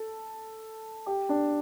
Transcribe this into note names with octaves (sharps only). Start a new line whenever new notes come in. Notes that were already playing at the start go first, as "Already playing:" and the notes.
Already playing: A4
G4
D4